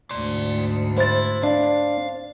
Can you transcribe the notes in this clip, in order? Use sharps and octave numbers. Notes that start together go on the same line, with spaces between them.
D2 G#2 D5 C6
E4 C5 A6
D4 F5